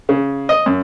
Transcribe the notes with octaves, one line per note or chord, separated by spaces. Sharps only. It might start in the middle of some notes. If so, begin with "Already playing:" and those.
C#3
D#5
F#2